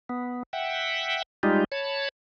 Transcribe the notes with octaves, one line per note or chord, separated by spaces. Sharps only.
B3
E5 F#5 G5
G3 G#3 D#4 F4 G4
C#5 A5 B5